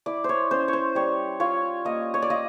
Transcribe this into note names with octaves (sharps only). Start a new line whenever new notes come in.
E4 D5
C5 C#5
C#4 C5
C#5
C5
G3 C#5
F4 C#5
A#3 D#5
C#5
D5
F4 D#5